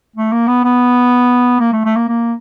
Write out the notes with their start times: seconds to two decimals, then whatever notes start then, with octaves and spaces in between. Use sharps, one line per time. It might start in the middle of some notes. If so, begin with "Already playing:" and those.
0.16 A3
0.32 A#3
0.47 B3
0.64 B3
1.60 A#3
1.73 A3
1.85 A3
1.96 A#3
2.08 A#3